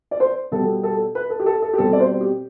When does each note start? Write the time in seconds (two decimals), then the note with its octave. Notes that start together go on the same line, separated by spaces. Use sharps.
0.11 D5
0.20 C5
0.51 B2 G3 B3 A4
0.83 A4
1.15 B4
1.30 A4
1.40 G4
1.46 A4
1.62 A4
1.73 G4
1.78 B2 G3 C4 A4
1.93 D5
2.00 C5
2.21 G4